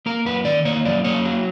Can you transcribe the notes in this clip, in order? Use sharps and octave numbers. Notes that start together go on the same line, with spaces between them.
A#3 A#4
F#2 B4
D#3 D5
A#3 C#5
F#2 D5
A#3 C#5
F#3